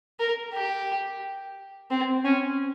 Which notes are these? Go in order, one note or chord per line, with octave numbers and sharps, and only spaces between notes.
A#4
G4
C4
C#4